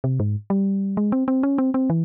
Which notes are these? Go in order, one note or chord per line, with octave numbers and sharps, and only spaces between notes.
C3
G#2
G3
G#3
C4
C4
C#4
C4
C4
E3